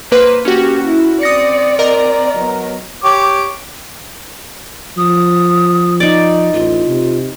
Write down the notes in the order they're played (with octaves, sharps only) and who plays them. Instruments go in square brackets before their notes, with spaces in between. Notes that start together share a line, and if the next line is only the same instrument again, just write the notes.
[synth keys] A#3 B4 [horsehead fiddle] C5
[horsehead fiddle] A#3 G4 [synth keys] C#4 F#4
[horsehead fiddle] E4
[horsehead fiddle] C4 D5 [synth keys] D#6 A#6 C#7
[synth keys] A#4 D#5 A#5
[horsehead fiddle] F#3 B3
[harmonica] G4 C#5 D6
[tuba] F3 [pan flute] D#6
[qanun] D#4 D5
[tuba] A1 [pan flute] F4
[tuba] C3